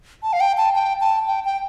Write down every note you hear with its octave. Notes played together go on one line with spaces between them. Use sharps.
A5
F5
G5
A5
G5
A5
G5
G5